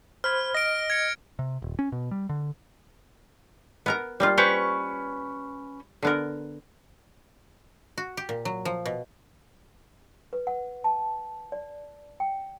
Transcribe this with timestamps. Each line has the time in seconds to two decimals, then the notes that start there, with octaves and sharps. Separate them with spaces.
0.24 C5 B5 F6 G#6
0.55 D#5 A#6 D7
0.90 G#6 C#7
1.39 C3
1.62 D#1
1.79 C#4
1.92 B2
2.11 G3
2.29 D3
3.86 B3 A#4 A#5
4.20 G3 A#3 F4
4.38 C#4 B4 C5 C#6
6.03 D3 B3 A#4
7.98 F#4
8.17 G4
8.29 A#2
8.45 F#3
8.65 F3
8.85 B2
10.33 B4
10.47 F#5
10.84 A5
11.52 D5
12.20 G5